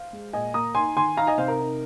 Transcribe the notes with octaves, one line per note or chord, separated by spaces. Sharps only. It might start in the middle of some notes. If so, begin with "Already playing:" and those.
Already playing: C5 F5
G#3
A#2 D#5 G#5
A#3 A#5 D#6
D#4 G#5 C6
D#3 G#5 C6
D#4 F5 A#5
D#5 G#5
C3 C5 F5
A#4
D#4